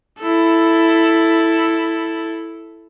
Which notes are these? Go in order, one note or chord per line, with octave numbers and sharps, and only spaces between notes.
E4 A4